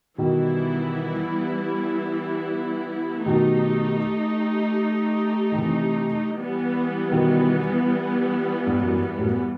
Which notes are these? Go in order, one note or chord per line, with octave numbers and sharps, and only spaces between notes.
B2 D#3 E3 G3 B3 E4
B2 D#3 A3 D#4 G4
D#3
C3 E3
E3 G3 B3
B2 D#3
G2
F#2
G2
F#2 A2